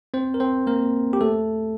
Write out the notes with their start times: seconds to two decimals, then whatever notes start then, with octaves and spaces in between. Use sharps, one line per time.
0.14 C4 C5
0.34 A#4
0.40 C4 C5
0.67 A#3 A#4
1.13 G4
1.21 A3 A4